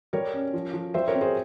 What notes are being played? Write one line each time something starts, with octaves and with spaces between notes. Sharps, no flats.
G3 A#4 C#5
C#4
F3
F3
G3 C5 E5
A#4 C#5
C4
G#4 C5